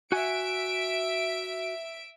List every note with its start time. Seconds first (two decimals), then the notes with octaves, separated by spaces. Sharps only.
0.12 F#4 E5 F#5 G#5 D7